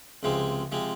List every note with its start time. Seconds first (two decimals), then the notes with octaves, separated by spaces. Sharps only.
0.23 C#2 C3 F3 G#3 C4
0.72 C3 F3 G#3 C4